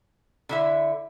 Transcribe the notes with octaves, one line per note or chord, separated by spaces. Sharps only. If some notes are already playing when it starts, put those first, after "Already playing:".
D3 E4 E5